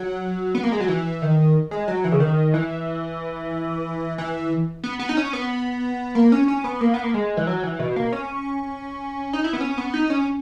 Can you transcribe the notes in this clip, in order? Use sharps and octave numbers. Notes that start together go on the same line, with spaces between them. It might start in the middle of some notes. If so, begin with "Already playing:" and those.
Already playing: F#3
B3
A#3
G#3
F#3
E3
D#3
G#3
F#3
E3
C#3
D#3
E3
E3
B3
B3
D#4
C#4
B3
A#3
C#4
C#4
B3
A#3
B3
A#3
G#3
E3
F#3
E3
B2
A#3
C#4
D#4
E4
B3
C#4
B3
D#4
C#4